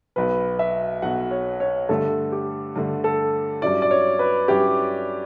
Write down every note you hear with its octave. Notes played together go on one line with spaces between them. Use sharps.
B1 B2 F#3 B4
E5
B1 B2 F#3 F#5
C#5
C#5
G2 D3 A3 A4
G4
G2 D3 A3
A4
G2 F#3 C#4 E4 D5
D5
C#5
B4
G2 F#3 C#4 E4 G4